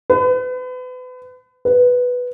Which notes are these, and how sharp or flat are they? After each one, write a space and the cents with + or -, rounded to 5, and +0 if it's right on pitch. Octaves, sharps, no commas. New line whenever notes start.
B4 +35
B4 +0